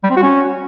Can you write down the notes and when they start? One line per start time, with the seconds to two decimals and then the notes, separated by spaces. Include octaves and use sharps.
0.04 G3
0.10 C4
0.17 F#4
0.23 C#4